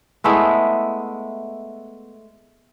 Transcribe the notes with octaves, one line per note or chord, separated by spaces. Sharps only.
G#3 A3 B3 E4